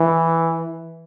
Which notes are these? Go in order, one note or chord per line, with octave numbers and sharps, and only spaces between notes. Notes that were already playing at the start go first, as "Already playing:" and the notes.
Already playing: E3